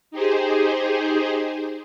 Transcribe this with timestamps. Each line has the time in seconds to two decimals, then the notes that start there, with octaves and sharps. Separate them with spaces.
0.11 D#4 G4 G#4 C5